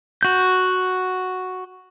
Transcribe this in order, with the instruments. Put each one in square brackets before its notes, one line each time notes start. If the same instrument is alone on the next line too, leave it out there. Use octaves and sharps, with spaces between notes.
[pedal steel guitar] F#4 G6